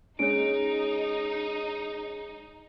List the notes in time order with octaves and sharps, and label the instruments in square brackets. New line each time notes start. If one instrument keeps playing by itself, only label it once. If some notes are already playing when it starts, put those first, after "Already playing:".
[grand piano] G#3 C#4 [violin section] D#4 [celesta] C#5 D7